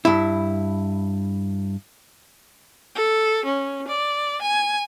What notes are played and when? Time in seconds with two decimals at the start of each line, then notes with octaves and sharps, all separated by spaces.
0.05 G2 E4
2.95 A4
3.45 C#4
3.88 D5
4.42 G#5